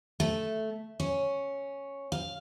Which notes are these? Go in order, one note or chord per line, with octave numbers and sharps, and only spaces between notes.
A3
C#4
F5